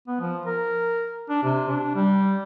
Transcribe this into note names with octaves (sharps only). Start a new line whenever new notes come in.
B3
F3
A#4
D4
C3
D4
G3